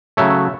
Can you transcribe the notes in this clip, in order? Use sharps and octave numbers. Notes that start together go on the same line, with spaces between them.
C#3 F#3 A3 C#5 E5